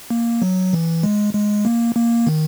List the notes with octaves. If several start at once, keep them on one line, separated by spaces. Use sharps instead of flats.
A#3
F#3
E3
G#3
G#3
A#3
A#3
D#3